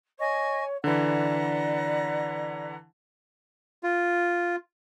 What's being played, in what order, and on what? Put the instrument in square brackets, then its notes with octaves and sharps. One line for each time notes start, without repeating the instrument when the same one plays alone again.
[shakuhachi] C#5 [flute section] D#5 G#5 C#6
[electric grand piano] D3 E3 [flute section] B4 F#5 A#5 [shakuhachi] D5
[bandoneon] F4